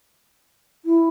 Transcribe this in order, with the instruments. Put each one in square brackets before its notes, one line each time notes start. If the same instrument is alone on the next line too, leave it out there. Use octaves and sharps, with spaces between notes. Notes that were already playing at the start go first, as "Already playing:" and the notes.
[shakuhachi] E4